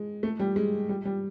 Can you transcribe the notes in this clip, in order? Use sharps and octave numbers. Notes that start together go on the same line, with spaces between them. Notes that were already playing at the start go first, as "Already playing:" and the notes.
Already playing: G#3
A3
G3
G#3
G3
G3